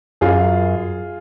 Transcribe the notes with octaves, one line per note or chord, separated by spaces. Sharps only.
F#2 F4 G#4